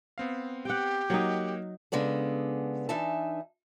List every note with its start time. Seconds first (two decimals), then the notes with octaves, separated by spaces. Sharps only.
0.18 B3 C4 F5
0.65 G4 F#5 G5
1.10 F#3 A#3 D#4 C#5 F#5
1.92 C#3 G#3 B3 D4 A4
2.89 E3 D4 D#4 E5 G#5 A5